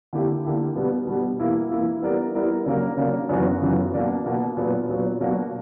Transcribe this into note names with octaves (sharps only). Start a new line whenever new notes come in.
D3 A#3 E4 G4
D3 A#3 E4 G4
B2 G3 B3
B2 G3 B3
E3 A#3 E4
E3 A#3 E4
G3 B3 E4 A#4 D5
G3 B3 E4 A#4 D5
C#3 F#3 A#3 D4 A#4
C#3 F#3 A#3 D4 A#4
F#2 C#3 E3 B3 F#4
F#2 C#3 E3 B3 F#4
B2 A#3 D4
B2 A#3 D4
A#2 F#3 B3
A#2 F#3 B3
B2 F#3 A#3 D4 F#4